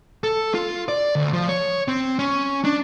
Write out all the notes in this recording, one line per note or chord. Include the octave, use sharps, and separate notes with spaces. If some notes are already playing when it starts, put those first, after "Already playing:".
A4
F4
D5
D2
F3
C#5
C4
C#4
D4